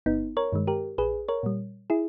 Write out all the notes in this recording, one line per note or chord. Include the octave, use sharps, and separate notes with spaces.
G1 B3 D#4
A#4 C#5
G2 D#3 G#3
G4 A#4
A#1 G#4 B4
A#4 C#5
A#2 G3
E4 G#4